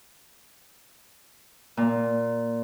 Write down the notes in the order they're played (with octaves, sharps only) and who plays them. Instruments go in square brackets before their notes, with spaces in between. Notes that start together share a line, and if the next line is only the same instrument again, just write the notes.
[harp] A#2